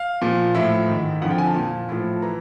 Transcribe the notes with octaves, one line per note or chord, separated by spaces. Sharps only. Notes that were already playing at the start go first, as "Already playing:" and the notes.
Already playing: F5
A#2 F3
A2 F3 E5
G#2 D#3
F2 D3 F3 F#5
G5
G#5
A5
A#2 F3
A2 F3
E3 A#5